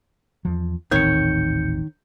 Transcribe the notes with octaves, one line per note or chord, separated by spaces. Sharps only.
E2 F3
D#1 A1 D#3 C4 C#5 G6 C#7